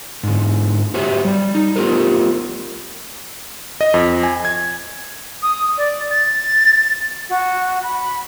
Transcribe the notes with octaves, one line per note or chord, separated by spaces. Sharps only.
G#2 D3
F#4 G4 C5 C#5 E5
G3 D5
D#4
A3 B3 F4 G4 A#4 C5
D#5
F2
G#5
G#6
D#6
D5
A6
F#4
B5